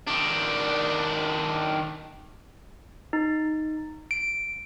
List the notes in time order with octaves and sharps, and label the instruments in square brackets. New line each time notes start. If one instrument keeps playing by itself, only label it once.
[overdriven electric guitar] D#3 D4
[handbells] D#4
D7